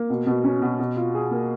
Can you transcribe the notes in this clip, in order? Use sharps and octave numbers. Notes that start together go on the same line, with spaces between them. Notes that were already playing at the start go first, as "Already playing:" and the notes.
Already playing: A#3
B2
B2
C#4
B2
B2
F4
G#4
A#3